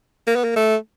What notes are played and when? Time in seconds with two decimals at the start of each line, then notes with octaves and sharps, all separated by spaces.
0.27 A#3
0.35 B3
0.44 A#3
0.56 A3